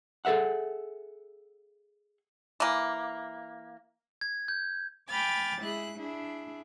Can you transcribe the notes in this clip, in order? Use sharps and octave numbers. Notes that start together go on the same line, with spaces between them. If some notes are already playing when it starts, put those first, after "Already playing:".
G#4 A4 B4 E5 F#5
E3 A#3
G#6
G6
G5 G#5 B5 D6 F6 A6
G#3 E4 G#4 F#6
D4 E4 G#4